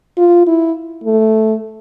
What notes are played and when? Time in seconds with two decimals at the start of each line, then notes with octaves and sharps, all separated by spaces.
0.17 F4
0.47 E4
1.04 A3